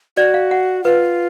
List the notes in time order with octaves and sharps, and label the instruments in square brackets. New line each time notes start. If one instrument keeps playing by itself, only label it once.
[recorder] F#4 [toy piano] D5
[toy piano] F5
F#5
[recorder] F4 [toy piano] B4